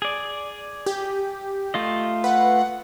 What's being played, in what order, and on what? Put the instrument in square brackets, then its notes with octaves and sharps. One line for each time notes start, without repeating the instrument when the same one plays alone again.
[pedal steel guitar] G#4 D5
[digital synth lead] G4
[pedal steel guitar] A3 F4 D#5
[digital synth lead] B4 [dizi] F#5